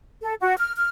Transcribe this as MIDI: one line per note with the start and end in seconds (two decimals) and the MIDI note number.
0.22 0.34 69
0.40 0.54 66
0.57 0.73 89
0.76 0.89 89